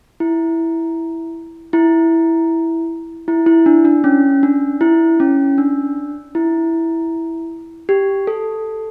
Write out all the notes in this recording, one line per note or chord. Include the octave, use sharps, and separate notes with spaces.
E4
E4
E4
E4
D4
D4
C#4
D4
E4
C#4
D4
E4
G4
A4